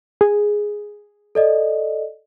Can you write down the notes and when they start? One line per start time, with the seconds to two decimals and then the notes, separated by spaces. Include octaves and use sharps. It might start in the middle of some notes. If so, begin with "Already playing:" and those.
0.21 G#4
1.35 A4 D5 D#5